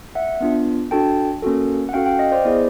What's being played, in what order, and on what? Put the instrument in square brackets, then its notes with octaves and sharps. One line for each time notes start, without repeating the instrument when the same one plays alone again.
[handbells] E5 F#5
B3 D4 F4
D4 F#4 A4 G5 A5
A#3 C#4 F#4 A4
F#5
C#4 F#4 A4 F5 G5
F5 G5
D#5 F5
C5 D5
B3 E4 G#4 C5 D5